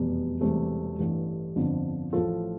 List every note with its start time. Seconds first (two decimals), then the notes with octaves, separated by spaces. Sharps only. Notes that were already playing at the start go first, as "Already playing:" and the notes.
Already playing: F1 E2 B2 G3
0.41 E1 E2 C3 G3 A3 C4
0.99 A1 G2 E3 G3
1.56 G1 F2 D3 F3
2.13 A1 A2 F3 F4 A4